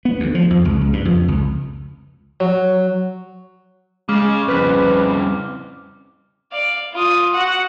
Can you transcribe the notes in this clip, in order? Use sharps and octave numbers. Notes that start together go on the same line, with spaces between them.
B3
D2
F3
F2
C#2
C#2
G2
F2
C#2
F#3
C#3 G#3 D6 F6
C2 F2 C#3 B4
D5 F5
F4 D#6
F#4 F#5